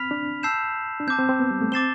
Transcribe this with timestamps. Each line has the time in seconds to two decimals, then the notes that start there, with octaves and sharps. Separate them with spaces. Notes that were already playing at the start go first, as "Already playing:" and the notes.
Already playing: C4 B5 F6 B6 F7
0.11 D4
0.43 A5 E6 G6 C7 E7
1.00 D4
1.08 C4 A5 D6 G6
1.19 C4
1.29 C4
1.40 B3
1.50 G3
1.62 A3
1.72 C4 D6 A6 C7 E7 G7